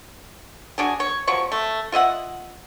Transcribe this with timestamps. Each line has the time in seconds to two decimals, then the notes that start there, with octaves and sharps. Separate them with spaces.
0.78 F#3 D4 G#4
1.00 C#5
1.27 C3 F3 F#3 C#6
1.52 A3
1.92 F4 D#5 E5 F#5